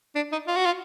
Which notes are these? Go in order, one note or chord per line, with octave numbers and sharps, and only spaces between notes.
D4
D#4
F4
F#4
F4